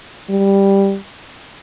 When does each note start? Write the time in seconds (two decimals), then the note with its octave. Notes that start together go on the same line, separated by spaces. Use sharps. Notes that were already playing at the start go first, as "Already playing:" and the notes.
0.30 G3